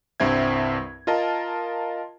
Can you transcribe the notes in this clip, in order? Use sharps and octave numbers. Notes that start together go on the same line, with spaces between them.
C2 G2 C4 E5 G#6
F4 A#4 D#5 A5